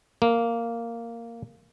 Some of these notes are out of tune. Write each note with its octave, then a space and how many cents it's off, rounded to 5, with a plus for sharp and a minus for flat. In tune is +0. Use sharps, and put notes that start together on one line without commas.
A#3 -10